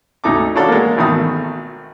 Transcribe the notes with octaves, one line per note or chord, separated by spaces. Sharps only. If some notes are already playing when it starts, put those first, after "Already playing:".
D2 D#4 A4 D6
C#4 D4 F#4 A4 D5 F5
G#3 A#3
G#1 B2 D#3 A3 A4 D#6